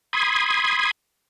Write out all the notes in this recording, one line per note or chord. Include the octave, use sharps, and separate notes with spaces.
B5 C6 D#6 G#6